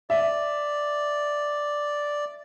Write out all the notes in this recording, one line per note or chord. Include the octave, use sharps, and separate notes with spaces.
D5 E5